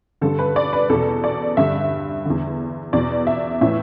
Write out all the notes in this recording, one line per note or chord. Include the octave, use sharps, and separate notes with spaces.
G2 D3 A4
B4
D5
B4
E2 B2 A4
D5
G2 D3 E5
E2 D3
E2 B2 D5
E5
A2 E3 E5